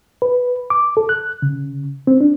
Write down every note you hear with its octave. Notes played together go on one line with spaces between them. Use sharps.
B4
D6
A4
F#6
C#3
C4
D4